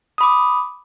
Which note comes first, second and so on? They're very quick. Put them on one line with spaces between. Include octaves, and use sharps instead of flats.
D#6 B5 D6